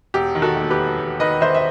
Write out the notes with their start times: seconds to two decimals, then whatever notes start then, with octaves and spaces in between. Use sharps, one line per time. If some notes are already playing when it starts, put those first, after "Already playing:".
0.14 E1 G4
0.35 D#3
0.42 F#4 A4
0.56 D#2
0.70 G4 B4
0.78 E1
0.99 E1
1.20 D#3 B4 D#5
1.41 D#3 C5 E5
1.55 E5